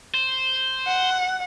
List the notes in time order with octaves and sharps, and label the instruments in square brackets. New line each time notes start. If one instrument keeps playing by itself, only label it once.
[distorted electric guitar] C5
[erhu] F#5